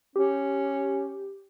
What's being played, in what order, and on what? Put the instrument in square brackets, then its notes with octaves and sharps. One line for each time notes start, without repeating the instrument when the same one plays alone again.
[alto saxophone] C#4 [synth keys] G4